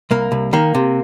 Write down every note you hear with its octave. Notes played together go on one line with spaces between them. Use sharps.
C2 A#3
C2
D#3 A#3
C3